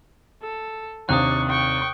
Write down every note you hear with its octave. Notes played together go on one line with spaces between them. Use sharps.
A4
D#2 C3 D4 C#6 D#6 F#6
G5 C#6